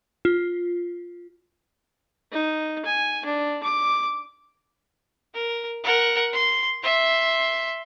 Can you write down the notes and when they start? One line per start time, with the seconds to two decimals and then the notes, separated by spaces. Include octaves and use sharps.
0.25 F4
2.32 D#4
2.85 G#5
3.25 D4
3.63 D6
5.34 A#4
5.84 A#4 F#5
6.33 C6
6.83 E5 C6